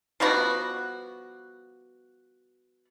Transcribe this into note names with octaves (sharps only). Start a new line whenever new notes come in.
F3 G3 B3 F#4